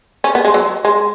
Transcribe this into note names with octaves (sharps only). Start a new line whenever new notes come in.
C#4
B3
G#3
F#3
G#3